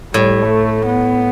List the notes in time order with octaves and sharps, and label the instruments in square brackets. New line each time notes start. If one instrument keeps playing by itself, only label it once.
[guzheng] A2 [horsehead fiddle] G3
[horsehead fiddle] A3
B3